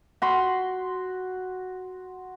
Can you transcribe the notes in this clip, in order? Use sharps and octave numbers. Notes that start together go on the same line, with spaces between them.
F#4 B5 C6